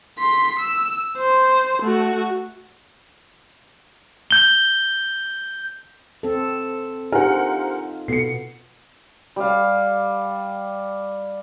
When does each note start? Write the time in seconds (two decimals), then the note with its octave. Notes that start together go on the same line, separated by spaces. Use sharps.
0.19 C6 B6
0.60 E6
1.17 C5
1.83 A3 F#4
4.31 G6 G7
6.23 C4 A4
7.12 D4 D#4 F4 G4 A#4 C5 F#5 G#5
8.08 B2 B3 A4 C7 C#7
9.36 G3 F5